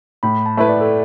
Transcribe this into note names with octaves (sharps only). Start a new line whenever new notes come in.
A2 B5
A5
A3 E4 B4
D5
A4